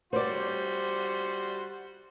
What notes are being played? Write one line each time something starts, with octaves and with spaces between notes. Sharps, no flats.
G3 F#4 C5 D5 C6